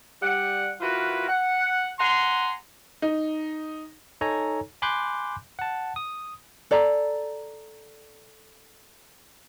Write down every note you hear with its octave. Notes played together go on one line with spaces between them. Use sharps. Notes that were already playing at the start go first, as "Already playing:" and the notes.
G3 F#5
E3 F4 F#4 A#4 B4
F#5
F#5 G#5 A#5 C6
D#4
D#4 A4 C#5 G#5 A#5
G#5 B5 C6 D6 F#6 G6
F#5 A5
D#6
A4 D5 A#5